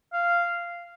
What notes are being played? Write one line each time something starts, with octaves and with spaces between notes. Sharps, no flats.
F5